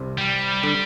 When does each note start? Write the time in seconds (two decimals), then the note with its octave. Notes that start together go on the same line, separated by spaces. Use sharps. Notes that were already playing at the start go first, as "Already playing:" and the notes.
Already playing: C2 C3
0.18 G3
0.63 D3